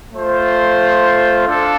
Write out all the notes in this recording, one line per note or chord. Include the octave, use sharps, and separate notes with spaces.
A3 F4 C5
D4 A4 F5